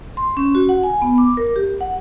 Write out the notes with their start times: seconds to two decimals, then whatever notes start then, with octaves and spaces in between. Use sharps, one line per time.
0.17 C6
0.37 C#4
0.55 F#4
0.69 F#5
0.83 G#5
1.02 B3
1.18 D6
1.37 A#4
1.56 G4
1.81 F#5